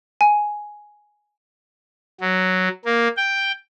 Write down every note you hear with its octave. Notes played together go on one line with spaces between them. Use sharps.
G#5
F#3
A#3
G5